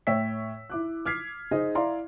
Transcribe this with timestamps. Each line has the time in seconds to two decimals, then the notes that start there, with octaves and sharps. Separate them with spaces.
0.07 A2 C#5 E5 G5 E6 B6
0.70 E4 D6 F#6
1.06 D6 F6 G#6 B6 C7
1.51 D#4 G#4 C5 D#5
1.75 E4 D5 E5 F5 A#5 C6